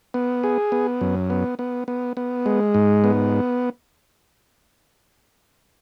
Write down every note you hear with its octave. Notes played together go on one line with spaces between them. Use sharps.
B3
G#4
B3
F#2
B3
B3
B3
B3
G#3
G#2
B3